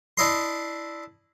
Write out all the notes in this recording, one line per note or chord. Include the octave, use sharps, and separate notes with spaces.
D4 E4 D#5 C6